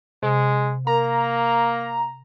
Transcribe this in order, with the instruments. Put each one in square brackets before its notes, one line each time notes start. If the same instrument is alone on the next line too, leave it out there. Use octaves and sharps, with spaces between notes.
[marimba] C3 [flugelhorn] G#3
[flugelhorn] A#3 [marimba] A#4 [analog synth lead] A#5